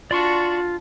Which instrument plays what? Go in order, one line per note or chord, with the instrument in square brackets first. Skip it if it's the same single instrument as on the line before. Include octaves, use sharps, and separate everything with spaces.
[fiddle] D4 F#4 [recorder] F4 [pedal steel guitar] D5 C6 C#6